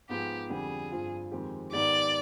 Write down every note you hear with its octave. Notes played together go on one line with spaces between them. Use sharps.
G#2 F3 B3 F4 G4 G#4
F2 D3 G3 D4 G4 G#4
G2 F3 C4 F4
F2 D#3 G#3 C4 G4
G#2 D#3 B3 D#4 G4 D5